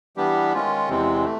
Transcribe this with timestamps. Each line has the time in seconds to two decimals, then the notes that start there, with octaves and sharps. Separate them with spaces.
0.17 E3 G3 B3 D4 G4
0.53 D#3 G#3 C#4 F4
0.89 E2 C3 E3 G#3 C4
1.25 A3